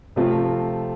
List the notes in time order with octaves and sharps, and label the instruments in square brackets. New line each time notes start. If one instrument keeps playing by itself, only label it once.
[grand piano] C3 F3 A3 C4 F4